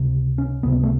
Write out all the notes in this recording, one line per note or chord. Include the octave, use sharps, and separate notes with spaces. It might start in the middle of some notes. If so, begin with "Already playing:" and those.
Already playing: C#2 C3
C#4
C#2 C3 B3
A3